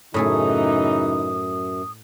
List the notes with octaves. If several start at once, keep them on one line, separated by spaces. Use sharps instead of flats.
F#2 A2 C#3 E3 A3 D#4 G#4 D#6